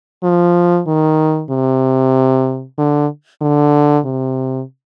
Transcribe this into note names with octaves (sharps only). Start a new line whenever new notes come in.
F3
D#3
C3
D3
D3
C3